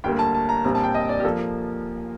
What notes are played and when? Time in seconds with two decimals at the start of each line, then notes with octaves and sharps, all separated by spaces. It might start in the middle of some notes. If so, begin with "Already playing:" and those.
0.04 D2 D3 G3 A#3 G5
0.19 A5
0.34 A5
0.49 A#5
0.64 A#1 A#2 G3 C4 A#5
0.75 A5
0.84 G5
0.95 D#5
1.09 D5
1.20 G4
1.24 F3 A#3 A4